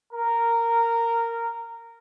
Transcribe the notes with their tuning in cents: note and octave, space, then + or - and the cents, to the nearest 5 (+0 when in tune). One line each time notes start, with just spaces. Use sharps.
A#4 -10